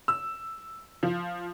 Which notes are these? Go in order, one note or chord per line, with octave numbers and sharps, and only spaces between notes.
E6
F3